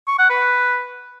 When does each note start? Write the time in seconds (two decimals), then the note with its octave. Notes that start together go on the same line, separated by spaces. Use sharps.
0.07 C#6
0.18 F#5
0.30 B4